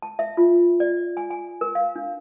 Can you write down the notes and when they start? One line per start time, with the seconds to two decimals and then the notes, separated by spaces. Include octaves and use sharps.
0.02 A5
0.19 E5
0.37 F4
0.80 D5
1.17 G#5
1.30 G#5
1.61 A#4
1.75 F5
1.96 D4